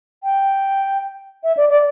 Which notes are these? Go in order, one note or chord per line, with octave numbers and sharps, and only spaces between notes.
G5
E5
D5
D5